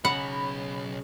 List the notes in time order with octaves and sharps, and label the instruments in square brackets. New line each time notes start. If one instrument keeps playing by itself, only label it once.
[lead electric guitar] B1 C#5 [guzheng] C#3 A#5 [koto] F#5 [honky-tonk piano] B5